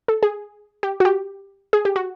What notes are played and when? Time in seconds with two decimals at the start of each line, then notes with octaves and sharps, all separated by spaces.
0.08 A4
0.23 G#4
0.83 G4
1.00 F#4
1.05 G4
1.73 G#4
1.85 G4
1.96 F#4